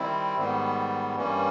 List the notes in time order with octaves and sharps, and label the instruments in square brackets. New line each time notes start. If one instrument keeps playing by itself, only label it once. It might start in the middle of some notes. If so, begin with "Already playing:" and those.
Already playing: [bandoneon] D#3 G3 C4 E4
G#2 D#3 G3 B3
G2 E3 G3 A#3 C#4